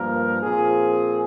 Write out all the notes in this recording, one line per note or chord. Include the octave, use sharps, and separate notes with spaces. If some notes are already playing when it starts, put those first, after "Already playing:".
Already playing: G2 F3 A#3 A#4
A#2 F3 C4 G#4